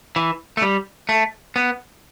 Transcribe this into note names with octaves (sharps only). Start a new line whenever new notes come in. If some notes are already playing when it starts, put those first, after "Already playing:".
E3
A3
G3
A3
B3